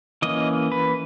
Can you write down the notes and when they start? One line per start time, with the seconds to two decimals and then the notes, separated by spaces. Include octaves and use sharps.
0.22 E3 A#3 C#4 D#5
0.72 B4